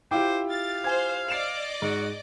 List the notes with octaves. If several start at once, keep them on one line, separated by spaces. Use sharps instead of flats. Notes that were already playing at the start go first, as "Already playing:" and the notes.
E4 F4 G4 C5 G5 D6
F5 A6
C5 G#5 G#6
D5 D#5 D6 C7 E7 F7
G#2 F#4